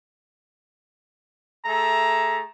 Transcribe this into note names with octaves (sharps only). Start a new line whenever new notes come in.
A3 G#4 A4 E5 A#5